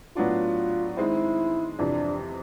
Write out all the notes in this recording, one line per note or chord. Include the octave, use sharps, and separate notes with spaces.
A2 F#3 B3 D4 F4
D#3 G#3 C4 E4
F2 C3 E3 D4